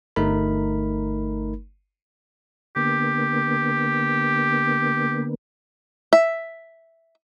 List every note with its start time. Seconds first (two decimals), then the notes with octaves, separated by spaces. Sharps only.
0.16 G1 A3 D#4 A#4 B5
2.76 D3 A#3 B3 G4
6.13 E5